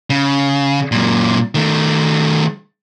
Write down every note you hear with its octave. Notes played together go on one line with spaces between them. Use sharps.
C#3
F#2 A#2
D#3 A3